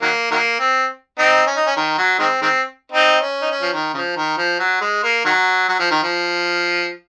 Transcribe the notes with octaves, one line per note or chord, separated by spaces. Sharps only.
D#3 F#3 A#3
D#3 F#3 A#3
C4
C4 D#4
C#4
D#4
C#4
D#3
F#3
D#3 G#3 C4
D#3 G#3 C4
C4 D#4
C#4
D#4
C#4
F3
D#3
C#3 F3
D#3
F3
F#3
G#3
A#3
D#3 F#3
F#3
F3
D#3
F3